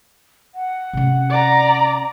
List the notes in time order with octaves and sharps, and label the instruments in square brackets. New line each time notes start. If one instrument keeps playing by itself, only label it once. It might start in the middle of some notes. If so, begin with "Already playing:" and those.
[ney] F#5
[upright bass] C3 C#4
[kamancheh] D5 A#5